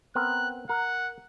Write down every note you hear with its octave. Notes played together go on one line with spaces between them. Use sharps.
B3 C4 A#4 F#6
A#4 F#5